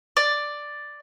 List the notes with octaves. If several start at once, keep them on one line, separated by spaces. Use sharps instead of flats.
D5